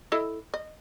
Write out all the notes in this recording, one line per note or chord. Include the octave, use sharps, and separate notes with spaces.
E4 A4 D#5
D#5